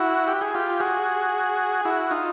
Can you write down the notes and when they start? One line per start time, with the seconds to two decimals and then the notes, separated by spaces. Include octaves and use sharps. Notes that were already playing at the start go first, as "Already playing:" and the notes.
Already playing: E4 F#4
0.28 G4
0.41 G#4
0.55 F4 G4
0.80 F#4 G#4
1.85 E4 F#4
2.11 D#4 F4